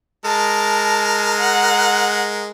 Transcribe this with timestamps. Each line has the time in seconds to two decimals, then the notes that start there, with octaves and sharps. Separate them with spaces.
0.25 G#3 A#4 A5
1.40 F#5